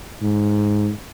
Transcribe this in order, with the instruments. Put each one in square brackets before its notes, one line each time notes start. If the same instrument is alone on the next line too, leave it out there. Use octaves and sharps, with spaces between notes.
[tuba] G#2